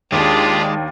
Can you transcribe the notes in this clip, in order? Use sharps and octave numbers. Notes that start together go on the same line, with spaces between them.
D#2 G#3 D4 F4 G4 G#4